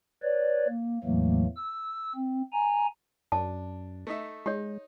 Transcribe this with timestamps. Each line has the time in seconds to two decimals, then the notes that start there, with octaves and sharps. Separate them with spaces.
0.22 B4 C#5 D5
0.68 A#3
1.04 E2 A2 E3 F#3 A3 A#3
1.56 E6
2.16 C4
2.52 G#5 A#5
3.32 F#2 D4 A5
4.07 A3 D#4 E5
4.46 G#3 D#4 G4 C#5